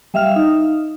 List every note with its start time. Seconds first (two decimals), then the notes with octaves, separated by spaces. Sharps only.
0.14 G3 E5 F5 F6
0.36 D#4